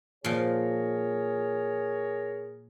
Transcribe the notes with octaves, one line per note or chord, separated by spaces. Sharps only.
A#2 F3 G#4 A#4 C#5